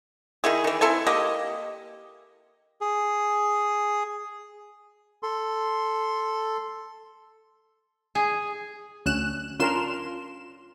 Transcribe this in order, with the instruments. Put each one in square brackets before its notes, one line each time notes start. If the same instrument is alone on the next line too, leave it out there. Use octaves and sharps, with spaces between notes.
[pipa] D#3 D#4 E4 G#4
D#3 E3
C4 E4 A4 G#5
A#3 G4 D#5
[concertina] G#4
A4 C6
[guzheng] G#4
[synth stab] D2 F#6 E7 [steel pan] C#4
[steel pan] C#4 D4 A#4 [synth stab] F4 C6 E7